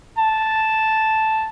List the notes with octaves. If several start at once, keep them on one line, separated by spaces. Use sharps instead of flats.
A5